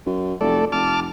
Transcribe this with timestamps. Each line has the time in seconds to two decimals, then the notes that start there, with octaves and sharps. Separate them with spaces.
0.06 F#2
0.41 F1 A3 A4 D5
0.72 F1 A5 D6 F6